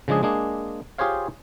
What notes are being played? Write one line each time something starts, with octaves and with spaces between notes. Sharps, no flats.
C#3 F3 G#3 D4 G#4
G#3 A#3 D4 G#4
F4 G4 G#4 C5 C#5 F5